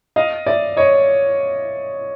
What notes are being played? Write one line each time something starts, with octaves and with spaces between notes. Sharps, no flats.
D#5 F5
D5 E5
C#5 D#5